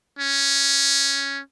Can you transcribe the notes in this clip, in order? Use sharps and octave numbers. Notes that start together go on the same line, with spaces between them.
C#4